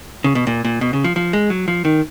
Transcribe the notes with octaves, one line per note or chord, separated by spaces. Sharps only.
C#3
B2
A#2
A#2
B2
C#3
F3
F3
G#3
F#3
F3
D#3